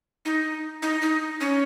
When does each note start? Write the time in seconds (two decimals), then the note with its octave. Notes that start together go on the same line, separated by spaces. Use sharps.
0.25 D#4
0.82 D#4
1.02 D#4
1.41 C#4